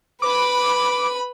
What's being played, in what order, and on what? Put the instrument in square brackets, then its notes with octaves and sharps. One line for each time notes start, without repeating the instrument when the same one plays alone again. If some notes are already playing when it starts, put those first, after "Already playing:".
[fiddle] B4 B5 [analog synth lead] D6